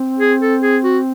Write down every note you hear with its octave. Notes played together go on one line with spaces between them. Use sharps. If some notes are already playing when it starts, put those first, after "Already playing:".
Already playing: C4
G#4
A4
G#4
F#4